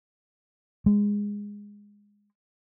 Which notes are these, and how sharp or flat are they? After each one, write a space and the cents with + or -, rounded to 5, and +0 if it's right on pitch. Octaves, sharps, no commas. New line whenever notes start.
G#3 -15